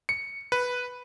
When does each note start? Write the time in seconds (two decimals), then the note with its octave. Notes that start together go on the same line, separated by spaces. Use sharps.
0.09 C#7
0.52 B4